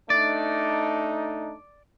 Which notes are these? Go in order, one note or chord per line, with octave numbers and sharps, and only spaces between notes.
A3 D4 D#4 D5